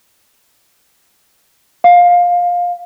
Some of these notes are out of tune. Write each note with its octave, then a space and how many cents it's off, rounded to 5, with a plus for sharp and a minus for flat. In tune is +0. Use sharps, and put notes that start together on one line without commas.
F5 +15